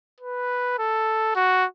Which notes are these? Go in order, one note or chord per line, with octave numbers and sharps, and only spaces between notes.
B4
A4
F#4